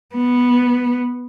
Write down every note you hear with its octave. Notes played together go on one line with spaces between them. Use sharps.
B3